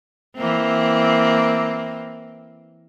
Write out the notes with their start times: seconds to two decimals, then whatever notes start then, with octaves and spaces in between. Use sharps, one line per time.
0.36 E3 A#3 C4